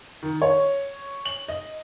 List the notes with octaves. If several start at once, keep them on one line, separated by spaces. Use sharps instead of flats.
D#3
C#5
F#7
D#5